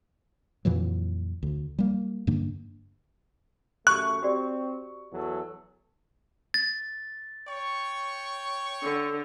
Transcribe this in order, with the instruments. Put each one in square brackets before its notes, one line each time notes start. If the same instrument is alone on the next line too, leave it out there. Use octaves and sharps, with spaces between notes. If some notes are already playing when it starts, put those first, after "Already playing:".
[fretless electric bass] F2 A#2 E3 F#3
D2
G3 A#3
G2 D3 A#3 D4
[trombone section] F#2 A3 [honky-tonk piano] C#6 [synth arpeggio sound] F#6
[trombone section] C4 [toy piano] F#4 G4 D5
[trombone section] E2 F#3 A4
[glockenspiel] A6
[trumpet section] C#5 G5 C#6
[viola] D3